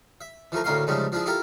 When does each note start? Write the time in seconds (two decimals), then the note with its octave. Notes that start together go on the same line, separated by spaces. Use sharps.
0.21 E5
0.52 E3 F3 A3 A#4
0.64 D2 A2 A#3 C#4 F5 C6
0.87 G#2 C#3 F3 G3 A3
1.12 F3 D4 E4 G#4
1.26 E4 F4 G4 A4 A#4